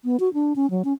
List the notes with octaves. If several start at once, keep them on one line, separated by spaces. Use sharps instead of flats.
B3
F#4
D4
C#4
F#3
C#4